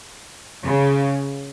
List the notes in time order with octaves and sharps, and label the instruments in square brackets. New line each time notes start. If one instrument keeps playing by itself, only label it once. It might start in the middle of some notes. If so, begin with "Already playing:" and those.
[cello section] C#3